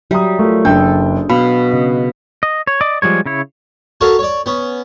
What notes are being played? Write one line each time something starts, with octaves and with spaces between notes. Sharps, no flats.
F#3 G3 E5 A#5 D#6
A3 F4 A#4
F#1 D4 G#4 A4 G5 G6
B2 F5 B5
C#3 D#5
D#5
C#5
D5 D#5 D6
F3 G3 G#3 C#5
C#3 E4 C#5
F#4 A4 A#4 C#5 F5
C#5 D5
B3 C#4